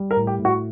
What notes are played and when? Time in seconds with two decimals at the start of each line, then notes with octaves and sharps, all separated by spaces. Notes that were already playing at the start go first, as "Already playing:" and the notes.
Already playing: G3
0.11 A#4
0.16 A2
0.27 G4
0.39 A2
0.45 F#4